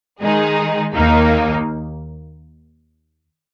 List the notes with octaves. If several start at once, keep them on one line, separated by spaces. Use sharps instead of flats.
D#3 G#3 D#4 G#4
D#2 D#3 A#3 D#4